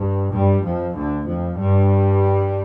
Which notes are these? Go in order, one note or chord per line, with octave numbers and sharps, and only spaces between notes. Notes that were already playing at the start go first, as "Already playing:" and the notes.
Already playing: G2
G2 G3
F2 F3
D2 D3
F2 F3
G2 G3